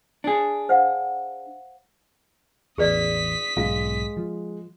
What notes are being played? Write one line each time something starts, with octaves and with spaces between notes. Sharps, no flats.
D4 G#4
C5 F5 F#5
A1 E2 G#4 B4 D5 D#6 B6
B1 G#2 G#3 F5
F3